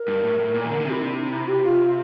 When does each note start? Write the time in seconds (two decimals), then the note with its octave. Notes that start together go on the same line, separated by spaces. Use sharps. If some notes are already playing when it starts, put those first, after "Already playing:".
Already playing: A#4
0.08 G2
0.23 A2
0.39 A2
0.54 A#2
0.65 E3
0.70 D3
0.81 D3
0.85 C3 E4
1.01 D4
1.17 E4
1.33 E4
1.47 G4
1.63 F4